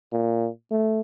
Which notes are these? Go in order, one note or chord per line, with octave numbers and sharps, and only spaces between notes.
A#2
A3